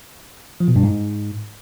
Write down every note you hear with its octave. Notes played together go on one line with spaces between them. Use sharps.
F3
B2
G2
G#2